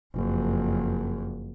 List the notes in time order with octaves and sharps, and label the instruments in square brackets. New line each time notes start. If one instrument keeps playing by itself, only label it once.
[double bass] F#1 F2